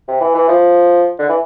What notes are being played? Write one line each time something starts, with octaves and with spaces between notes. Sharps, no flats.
C3
E3
E3
F3
D3
E3